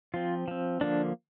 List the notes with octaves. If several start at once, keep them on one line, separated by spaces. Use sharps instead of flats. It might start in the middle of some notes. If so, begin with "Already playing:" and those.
F3 C4 F4
F3 C4
D3 F3 A#3 D4